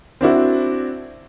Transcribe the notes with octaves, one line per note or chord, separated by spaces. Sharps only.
C4 D4 E4 F#4